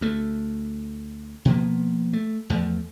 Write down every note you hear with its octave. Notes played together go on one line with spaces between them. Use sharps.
D2 A3
B2 F3 A#3 B3
A3
E2 F3 A3